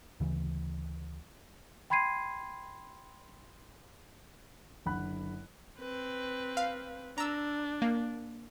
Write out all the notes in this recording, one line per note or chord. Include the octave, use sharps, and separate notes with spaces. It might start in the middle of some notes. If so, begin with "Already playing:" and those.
D2 C#3 E3
G5 B5 C6 G#6 C7 D#7
F#1 D3 F#5 B5 F#6
C4 B4
F5
D4 A#5 E6
A#3